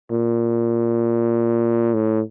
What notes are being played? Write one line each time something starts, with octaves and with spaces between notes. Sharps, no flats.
A#2
A2